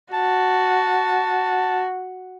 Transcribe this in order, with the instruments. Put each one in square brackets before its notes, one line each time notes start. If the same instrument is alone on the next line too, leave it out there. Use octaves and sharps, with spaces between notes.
[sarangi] F#4 [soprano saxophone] A5